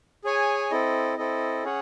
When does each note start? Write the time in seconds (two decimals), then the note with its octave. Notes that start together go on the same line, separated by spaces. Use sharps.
0.24 G#4 C#5 G#5
0.71 C4 E4 A4 D#5
1.17 C4 E4 A4 D#5
1.63 C#4 G#4 C#5 F#5